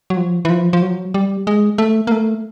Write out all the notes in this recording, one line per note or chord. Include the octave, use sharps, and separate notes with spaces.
F#3
F3
E3
F3
F3
F#3
G3
G#3
A3
A#3
A3